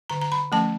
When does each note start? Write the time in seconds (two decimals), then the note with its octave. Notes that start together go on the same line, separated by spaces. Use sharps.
0.10 D3 A#5
0.22 A#5
0.32 B5
0.52 F3 A3 C#4 A5